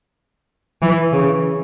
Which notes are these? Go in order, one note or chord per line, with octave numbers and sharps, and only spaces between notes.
E3
C#3